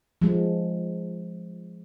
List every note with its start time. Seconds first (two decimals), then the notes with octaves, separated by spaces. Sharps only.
0.22 F3 G#3